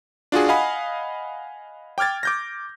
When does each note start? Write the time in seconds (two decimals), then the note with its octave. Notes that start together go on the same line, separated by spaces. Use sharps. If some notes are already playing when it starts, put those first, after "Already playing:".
0.32 D4 F4 F#4 G#4
0.49 D#5 F5 F#5 G#5 B5 D#6
1.98 G5 D6 F6 G#6 A6
2.23 D6 G6 A#6